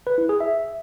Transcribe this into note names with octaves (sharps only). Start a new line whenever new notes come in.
B4
E4
G#4
E5